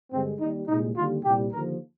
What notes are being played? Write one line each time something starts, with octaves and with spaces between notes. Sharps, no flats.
G2 D3 G#3 C4
D#2 D#3 G3 D#4
C2 A#2 G#3 D#4
D#2 D3 G3 F4
C2 A#2 G3 G4
D#2 D3 F3 A#4